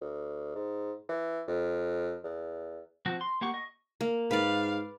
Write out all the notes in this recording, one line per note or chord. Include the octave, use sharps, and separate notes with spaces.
D2
G#2
E3
F2
E2
F3 C4 F#4
C6
A#3 G4 F#5 C#6
D#5 C#6
A#3
G#2 B4 D5 F5